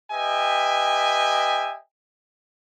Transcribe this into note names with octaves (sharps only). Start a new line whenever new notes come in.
G4 B4 D#5 E5 G5 G#5